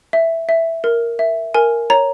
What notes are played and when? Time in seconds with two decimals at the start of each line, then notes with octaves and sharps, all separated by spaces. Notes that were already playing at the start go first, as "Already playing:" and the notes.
0.13 E5
0.49 E5
0.84 A#4
1.19 E5
1.54 A#4 G#5
1.90 C#5 A#5